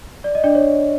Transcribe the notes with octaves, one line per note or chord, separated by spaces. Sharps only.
D5
D#5
D4 D5
C#5